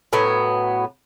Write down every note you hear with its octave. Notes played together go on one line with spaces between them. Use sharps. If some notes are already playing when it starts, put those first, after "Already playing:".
A2 F#3 B3